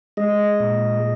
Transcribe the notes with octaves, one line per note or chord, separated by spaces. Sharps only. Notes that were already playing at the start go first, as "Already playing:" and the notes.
G#3 D#5
A#2